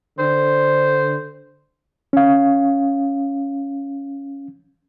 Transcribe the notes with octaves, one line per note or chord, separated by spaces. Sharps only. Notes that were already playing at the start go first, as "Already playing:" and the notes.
D3 C5
C#4 F5